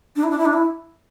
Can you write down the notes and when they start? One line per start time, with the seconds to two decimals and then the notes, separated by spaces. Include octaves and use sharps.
0.16 D4
0.23 E4
0.30 D4
0.38 E4
0.45 D4
0.53 E4